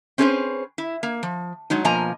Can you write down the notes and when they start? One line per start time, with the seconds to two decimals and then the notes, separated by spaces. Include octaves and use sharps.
0.18 C4 C#4 G#4 A4 B4 C5
0.78 E4
1.03 A#3
1.23 F3
1.70 F#3 G#3 D#4
1.85 B2 F3 A#3 D#5 G#5 A#5